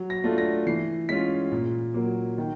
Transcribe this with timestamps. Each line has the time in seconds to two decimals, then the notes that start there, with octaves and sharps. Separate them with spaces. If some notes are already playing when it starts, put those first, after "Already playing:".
Already playing: F#3
0.10 A#6
0.24 A3 D4 F4
0.38 A#6
0.67 E3 C7
1.09 G#3 C#4 F4 B6
1.52 A#2
1.94 F#3 A#3
2.38 D#3